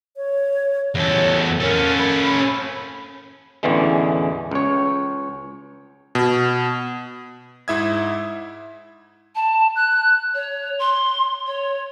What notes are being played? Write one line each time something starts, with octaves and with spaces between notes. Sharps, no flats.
C#5
E2 A4 C#5
C#4 A4 A#4
B5
A1 E2 D3 E3 G#3
C#2 C#5
B2
G#2 E4 E5 D#6 G#6
A5
F#6
C#5
C6
C#5